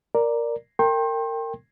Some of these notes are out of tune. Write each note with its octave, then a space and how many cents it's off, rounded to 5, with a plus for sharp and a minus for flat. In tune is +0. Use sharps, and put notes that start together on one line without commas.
A#4 +0 D5 +0
A#4 -30 G5 +10 C6 +40